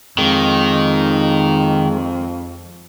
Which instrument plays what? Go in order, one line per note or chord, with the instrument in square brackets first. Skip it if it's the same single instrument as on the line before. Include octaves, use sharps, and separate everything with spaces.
[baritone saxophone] F2 [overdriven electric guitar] D#3 [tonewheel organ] G#3